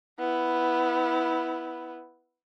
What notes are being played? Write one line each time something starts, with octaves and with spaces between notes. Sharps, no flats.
B3 E4